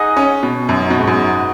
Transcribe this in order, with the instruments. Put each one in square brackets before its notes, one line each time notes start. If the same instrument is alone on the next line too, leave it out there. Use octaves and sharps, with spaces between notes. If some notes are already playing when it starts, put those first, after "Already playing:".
Already playing: [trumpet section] D#4 G#4 D#5 F#5
[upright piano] C#4
B2
[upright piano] F#2 [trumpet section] G#3 B3 D#4 F#4 D#5
[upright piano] B2
G#2
F#2